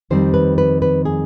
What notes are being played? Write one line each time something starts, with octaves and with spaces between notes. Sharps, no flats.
F2 D#3 G3 C4 C5
B4
B4
B4
G#4